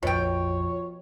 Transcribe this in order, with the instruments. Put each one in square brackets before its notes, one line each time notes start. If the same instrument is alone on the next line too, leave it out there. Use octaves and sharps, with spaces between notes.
[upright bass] A#1 F2 [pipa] B2 G5 [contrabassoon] F3 [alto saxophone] C#5